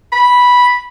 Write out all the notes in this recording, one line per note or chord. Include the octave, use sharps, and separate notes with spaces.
B5